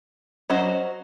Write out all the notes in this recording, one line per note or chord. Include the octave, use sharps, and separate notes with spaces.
F#3 C#4 F#4 C5 D#5